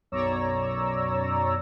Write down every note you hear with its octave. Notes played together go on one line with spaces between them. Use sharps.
B1 F#2 C#5 D5 A#5 E6